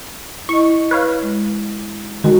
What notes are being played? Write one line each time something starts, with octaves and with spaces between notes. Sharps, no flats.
E4 D#5 C#6
B4 C#5 F5
G#3
D#3 G#3 F#4